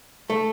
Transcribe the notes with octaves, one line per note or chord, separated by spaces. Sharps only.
A3